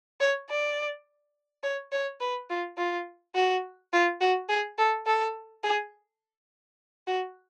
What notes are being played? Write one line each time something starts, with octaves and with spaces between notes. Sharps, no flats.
C#5
D5
C#5
C#5
B4
F4
F4
F#4
F4
F#4
G#4
A4
A4
G#4
F#4